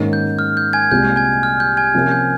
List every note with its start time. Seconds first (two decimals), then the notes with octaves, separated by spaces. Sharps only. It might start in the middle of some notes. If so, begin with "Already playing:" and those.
Already playing: G#2 D#3 A#3 C#4 G#4
0.13 G6
0.39 F6
0.57 G6
0.73 G#5 G#6
0.91 C2 A#2 G#3 C4 F4 G6
1.16 G#5 G#6
1.43 F6
1.60 G6
1.77 G#5 G#6
1.94 C3 F3 A#3 C#4
2.11 G6